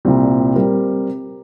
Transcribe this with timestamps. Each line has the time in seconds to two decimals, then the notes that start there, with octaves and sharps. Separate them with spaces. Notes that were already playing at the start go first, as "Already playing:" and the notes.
0.05 C2 A#2 G3 C4
0.56 G3 C4 G4 A#4